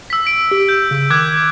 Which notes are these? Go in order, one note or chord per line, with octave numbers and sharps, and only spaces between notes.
E6 B6
B6 D7
G4
G6
C#3
D#3 D6 F#6 G#6